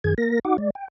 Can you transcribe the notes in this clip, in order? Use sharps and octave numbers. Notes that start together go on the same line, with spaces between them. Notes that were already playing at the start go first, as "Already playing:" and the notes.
F#2 D#3 G#4 G#6
A#3 A#4 A#6
D#4 F#4 F#5 D6
G#3 D5
G5